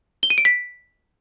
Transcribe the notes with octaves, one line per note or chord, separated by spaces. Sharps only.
G7
D#7
D7
B6